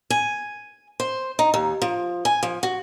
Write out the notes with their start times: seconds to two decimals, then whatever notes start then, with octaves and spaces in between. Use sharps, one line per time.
0.10 G#5
1.00 C5
1.39 D#4
1.54 D#2
1.82 F3
2.25 G#5
2.43 F3
2.63 F#4